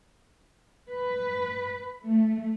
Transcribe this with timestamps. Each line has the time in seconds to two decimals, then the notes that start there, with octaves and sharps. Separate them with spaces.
0.90 B4
2.02 A3